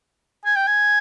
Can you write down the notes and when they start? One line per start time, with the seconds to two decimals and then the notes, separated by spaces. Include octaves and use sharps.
0.45 G#5
0.56 G5
0.67 G#5